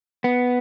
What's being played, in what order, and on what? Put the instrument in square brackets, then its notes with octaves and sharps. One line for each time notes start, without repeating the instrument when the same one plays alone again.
[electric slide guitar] B3